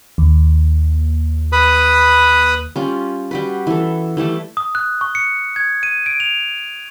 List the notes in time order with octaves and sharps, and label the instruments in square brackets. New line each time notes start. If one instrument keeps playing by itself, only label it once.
[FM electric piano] D#2
[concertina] B4 B5 D#6
[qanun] G3 C#4 F4
G3 F#4 B4
E3 A4
E3 G3 A3 A5
[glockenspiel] D#6
F#6
C#6
C#7
G#6
D#7
D7
F7